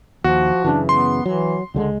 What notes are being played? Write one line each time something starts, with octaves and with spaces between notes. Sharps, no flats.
D#2 F3 F#4
F#2 C#3 E3 D4
B3 C6
E3 F#3
C#2 D3 G3 G#3